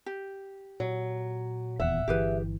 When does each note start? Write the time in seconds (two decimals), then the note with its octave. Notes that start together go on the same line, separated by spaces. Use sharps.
0.06 G4
0.80 A#2 F#3
1.80 D#1 E2 E5 F#5
2.08 G1 E3 G4 G#4 B4